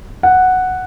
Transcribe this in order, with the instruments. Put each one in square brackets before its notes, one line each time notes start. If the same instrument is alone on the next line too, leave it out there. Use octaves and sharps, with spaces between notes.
[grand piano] F#5